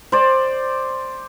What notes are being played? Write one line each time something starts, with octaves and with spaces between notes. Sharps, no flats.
C5 D5